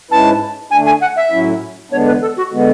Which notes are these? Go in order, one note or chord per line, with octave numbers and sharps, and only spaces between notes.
G#2 G#3 C#4 E4 B4 A5
D3 A3 D4 G#5
G#5
F#5
E5
A2 F#3 C#4 E4
E2 D3 G#3 B3 D4 C#5
B4
A4
F#4
D3 G#3 B3